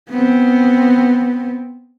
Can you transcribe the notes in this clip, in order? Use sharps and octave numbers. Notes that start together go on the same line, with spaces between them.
B3 C4